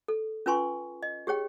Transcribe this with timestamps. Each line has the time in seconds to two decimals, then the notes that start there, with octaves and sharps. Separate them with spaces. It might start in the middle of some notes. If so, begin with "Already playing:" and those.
0.08 A4
0.46 C#4 F4 B4 G#5 C6 C#6
1.03 D#5
1.27 G4 G#4 C#5 G5